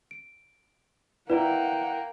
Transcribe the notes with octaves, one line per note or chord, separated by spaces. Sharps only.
D7
A#3 E4 B4 D5 F#5 G5 A#5